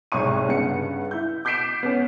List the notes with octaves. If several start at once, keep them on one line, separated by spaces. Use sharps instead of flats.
C2 G#2 C#5 C#6 D#7
G2 C#3 F#5 C#7
E4 G6
D6 G6 B6 C7 D7 E7
B3 C#4